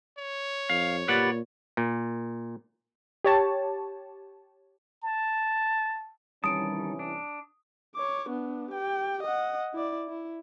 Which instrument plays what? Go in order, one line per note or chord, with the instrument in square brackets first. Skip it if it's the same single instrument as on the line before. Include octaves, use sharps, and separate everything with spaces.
[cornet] C#5
[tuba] F2 [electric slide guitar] F5
[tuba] A#2 [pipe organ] G4 B5 A6 [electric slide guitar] B4 D5 F#5
[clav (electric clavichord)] A#2
[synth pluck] G4 C#5 A5
[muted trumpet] A5
[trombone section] C2 E3 C#4 [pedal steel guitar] D#3 G3 A5 [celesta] D#6 D7
[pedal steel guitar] D4
[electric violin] C#5 D6
B3 D4
G4 G5
D#5 F#5
E4 D5
E4